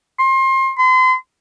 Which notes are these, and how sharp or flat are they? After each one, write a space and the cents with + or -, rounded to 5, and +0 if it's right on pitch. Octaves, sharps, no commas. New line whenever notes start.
C6 +30
C6 -35